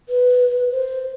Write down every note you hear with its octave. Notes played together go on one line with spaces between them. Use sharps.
B4
C5